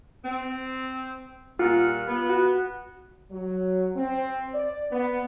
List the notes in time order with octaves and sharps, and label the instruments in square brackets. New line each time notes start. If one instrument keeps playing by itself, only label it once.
[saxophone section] C4
[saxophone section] A#2 G3 F#5 [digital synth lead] F4
[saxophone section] B3
[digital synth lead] F#4
[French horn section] F#3
C4
D5
B3